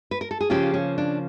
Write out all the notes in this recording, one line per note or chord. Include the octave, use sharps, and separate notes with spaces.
B4
A#4
A4
G#4
C#3 F3 A#3 C#4 F4 G4
C#4
D4